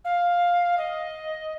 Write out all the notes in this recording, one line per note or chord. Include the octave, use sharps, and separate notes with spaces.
F5
D#5